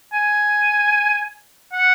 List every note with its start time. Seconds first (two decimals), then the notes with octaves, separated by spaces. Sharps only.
0.13 G#5
1.73 F#5